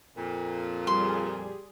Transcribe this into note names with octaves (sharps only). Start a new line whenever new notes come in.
F2 A#2
G3 G#4 C6